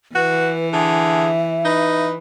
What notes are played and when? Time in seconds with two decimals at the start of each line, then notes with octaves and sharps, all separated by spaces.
0.15 E3 F#4 B4
0.73 D3 G#4 E5
1.65 D#4 B4